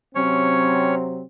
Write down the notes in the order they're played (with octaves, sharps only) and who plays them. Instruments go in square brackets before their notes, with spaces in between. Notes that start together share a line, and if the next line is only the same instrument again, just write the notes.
[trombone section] C3 F#3 C4 [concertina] C#4 C#5